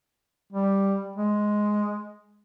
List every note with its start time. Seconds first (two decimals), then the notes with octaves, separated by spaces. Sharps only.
0.52 G3
1.16 G#3